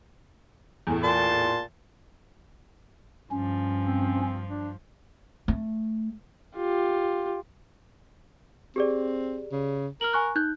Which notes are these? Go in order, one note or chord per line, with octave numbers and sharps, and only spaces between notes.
E2 A2
A#2 A5 C6
G2 F3 C#4
C4
D4
A3
F4 G4
C4 G4 G#4 D5
C#3
A#4 F6 F#7
G#5 C#6 F#6
D#4 F#6 G6